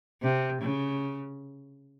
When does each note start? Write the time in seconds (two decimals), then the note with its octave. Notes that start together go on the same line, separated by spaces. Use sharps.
0.22 C3
0.61 C#3